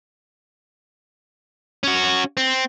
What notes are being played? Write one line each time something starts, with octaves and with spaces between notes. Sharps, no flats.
C#4 F#4
C4